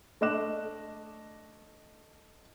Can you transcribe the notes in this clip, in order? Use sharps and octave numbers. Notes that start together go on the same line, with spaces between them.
A3 D4 D#5 D6 F#6 E7